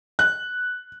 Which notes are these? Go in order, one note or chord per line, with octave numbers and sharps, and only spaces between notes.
F#6